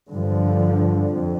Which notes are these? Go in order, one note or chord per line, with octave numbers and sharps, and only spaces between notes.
G2 D3 F3
F2